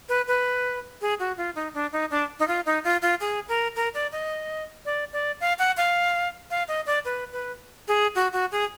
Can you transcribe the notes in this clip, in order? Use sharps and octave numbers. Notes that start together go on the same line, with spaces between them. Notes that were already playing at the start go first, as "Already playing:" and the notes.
B4
B4
G#4
F#4
F4
D#4
D4
D#4
D4
D#4
F4
D#4
F4
F4
G#4
A#4
A#4
D5
D#5
D5
D5
F5
F#5
F5
F5
D#5
D5
B4
B4
G#4
F#4
F#4
G#4